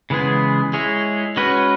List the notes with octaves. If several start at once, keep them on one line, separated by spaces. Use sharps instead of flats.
C#3 E3 G#3 B3 G#4
G#3 E4 G#4 C#5
G#3 C#4 F#4 B4